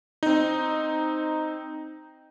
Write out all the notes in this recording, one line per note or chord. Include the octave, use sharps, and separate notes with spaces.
C4 D#4